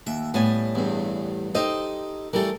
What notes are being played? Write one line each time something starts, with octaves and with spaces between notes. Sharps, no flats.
D#2 E5
A2 G3 B3 G#5
E2 G2
D#4 G4 A4 C5 D#5
E3 G3 A3 A4 A#4